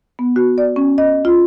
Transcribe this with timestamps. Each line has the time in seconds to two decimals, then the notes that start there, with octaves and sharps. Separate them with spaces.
0.19 B3
0.36 F#4
0.58 D5
0.76 C#4
0.98 D#5
1.25 F4